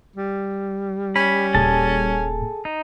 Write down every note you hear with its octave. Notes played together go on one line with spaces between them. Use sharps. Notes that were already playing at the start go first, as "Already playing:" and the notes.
G3
C#4 B5
D#1 A#2 G#4 A4 A5
D#4